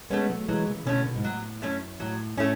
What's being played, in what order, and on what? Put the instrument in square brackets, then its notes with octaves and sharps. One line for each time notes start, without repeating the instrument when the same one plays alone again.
[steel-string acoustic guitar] G#3 B3 [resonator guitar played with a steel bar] A3 C#4
[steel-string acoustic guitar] F#3 A3
[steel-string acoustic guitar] E3 G#3 [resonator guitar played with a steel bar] F#3
[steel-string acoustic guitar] C#3 E3
[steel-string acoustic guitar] B2 D3 [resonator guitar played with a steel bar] A3 C#4
[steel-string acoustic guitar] B2
G#2
[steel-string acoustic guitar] A2 [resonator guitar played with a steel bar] F#3
[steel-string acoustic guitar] F#2 [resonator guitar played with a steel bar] A3 C#4
[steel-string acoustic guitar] A2 [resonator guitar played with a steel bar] F#3
[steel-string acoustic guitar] A2 [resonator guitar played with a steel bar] A3 C#4